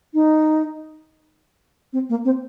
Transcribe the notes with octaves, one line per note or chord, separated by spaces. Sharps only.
D#4
C4
A#3
C4